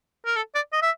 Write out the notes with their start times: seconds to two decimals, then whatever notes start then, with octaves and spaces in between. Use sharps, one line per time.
0.25 A#4
0.36 A4
0.55 D5
0.73 D#5
0.82 E5